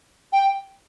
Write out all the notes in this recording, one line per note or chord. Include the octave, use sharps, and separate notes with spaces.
G5